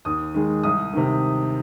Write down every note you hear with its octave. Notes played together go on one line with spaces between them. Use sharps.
D#2 D#6
D#3 G#3
C2 D#6
C3 D#3